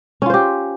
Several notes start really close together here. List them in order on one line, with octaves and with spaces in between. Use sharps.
C#4 F4 C5 G4